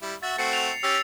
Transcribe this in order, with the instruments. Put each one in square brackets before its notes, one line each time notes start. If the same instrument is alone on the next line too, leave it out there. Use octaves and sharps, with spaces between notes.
[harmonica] G3 E4
[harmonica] F#4 E5 [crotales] A6
[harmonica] A3 C4 F#4 [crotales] C7 C#7
[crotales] F7
[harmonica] C#4 G4 [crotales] E6 A6